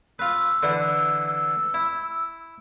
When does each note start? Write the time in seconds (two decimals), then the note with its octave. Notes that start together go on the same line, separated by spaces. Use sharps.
0.19 F4 B4 E6
0.63 D3 E3 E4
1.74 E4